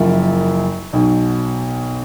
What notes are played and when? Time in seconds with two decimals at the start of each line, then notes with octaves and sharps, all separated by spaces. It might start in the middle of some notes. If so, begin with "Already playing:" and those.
Already playing: F#1 F#2 F3
0.93 B1 B2